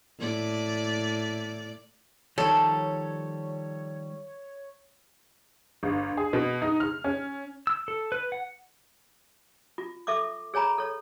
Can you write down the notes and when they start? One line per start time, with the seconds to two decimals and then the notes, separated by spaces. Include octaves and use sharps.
0.19 A2 D5
2.38 D#3 F3 G3 A4 C#5
5.83 G1
6.17 G#4
6.33 B2
6.62 D#4
6.80 F6
7.04 C#4
7.67 E6
7.88 A4
8.12 B4
8.32 F#5
9.78 F4
10.07 A4 E5 C#6 D6
10.54 G#4 C#5 G#5 A#5 B5
10.78 A4 C#5